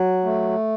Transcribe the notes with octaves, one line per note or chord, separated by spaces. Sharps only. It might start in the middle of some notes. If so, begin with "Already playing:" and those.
Already playing: F#3
A3